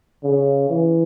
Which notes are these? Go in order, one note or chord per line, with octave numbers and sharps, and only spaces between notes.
C#3
E3